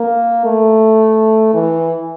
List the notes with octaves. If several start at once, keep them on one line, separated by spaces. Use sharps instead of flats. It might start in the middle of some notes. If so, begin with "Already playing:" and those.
Already playing: A#3
A3
E3